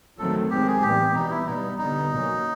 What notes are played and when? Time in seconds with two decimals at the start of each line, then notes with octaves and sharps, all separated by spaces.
0.18 D#3 F#3 A3 C4 A4
0.50 D#3 G#3 C4 G4
0.67 G#4
0.82 A2 E3 G3 B3 G4
1.14 B2 G3 B3 D#4
1.30 E4
1.46 B2 G3 B3 D#4
1.78 D3 G3 B3 D#4
2.10 B2 F#3 A#3 C#4